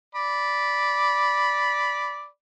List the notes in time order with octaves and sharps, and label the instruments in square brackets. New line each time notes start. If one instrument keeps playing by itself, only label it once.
[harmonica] D5 B5